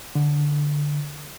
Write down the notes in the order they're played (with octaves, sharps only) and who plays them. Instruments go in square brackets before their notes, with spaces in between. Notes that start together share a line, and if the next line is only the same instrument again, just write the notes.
[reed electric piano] D3